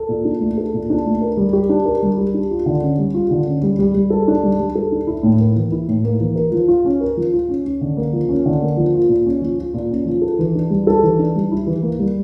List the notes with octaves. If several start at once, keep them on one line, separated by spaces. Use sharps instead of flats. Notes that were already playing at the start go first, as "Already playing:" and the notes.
Already playing: A4
A#2
D4
A3
A4
A#2
D4
A3
A#4
G3
G4
D4
A#4
G3
G4
D4
F4
D3
C#4
G3
F4
D3
C#4
G3
G3
G3
A4
D4
G3
G3
A4
D4
E4
A2
A#3
E3
E4
A2
A#3
E3
A#4
F3
F4
C#4
A#4
F3
F4
C#4
C#4
D3
A#3
F3
C#4
D3
A#3
F3
F4
A#2
C#4
F3
F4
A#2
C#4
F3
A4
E3
D4
G3
A4
E3
D4
G3
E4
E3
A#3
G3